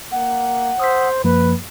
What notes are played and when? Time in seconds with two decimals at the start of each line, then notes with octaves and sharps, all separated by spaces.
0.12 A#3 F#5
0.80 C5 D#6 E6 B6
1.24 F#2 F3 A#3 B4